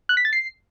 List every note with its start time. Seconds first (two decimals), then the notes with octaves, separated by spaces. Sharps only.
0.09 F#6
0.17 B6
0.25 A6
0.33 C7